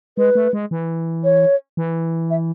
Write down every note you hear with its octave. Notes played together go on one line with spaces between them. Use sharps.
G#3 B4
A3
G#3
E3
C#5
E3
E5